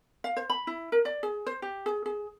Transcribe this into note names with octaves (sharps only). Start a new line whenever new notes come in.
F5
C5
B5
E4
A#4
D5
G#4
C5
G4
G#4
G#4